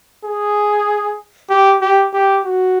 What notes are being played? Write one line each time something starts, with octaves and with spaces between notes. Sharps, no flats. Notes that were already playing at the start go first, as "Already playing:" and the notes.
G#4
G4
G4
G4
F#4